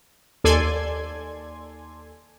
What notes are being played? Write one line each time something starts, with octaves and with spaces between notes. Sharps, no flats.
D#2 A4 D5 G#5 C6 G#6